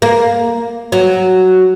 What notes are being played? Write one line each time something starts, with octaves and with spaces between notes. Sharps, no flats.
A#3
F#3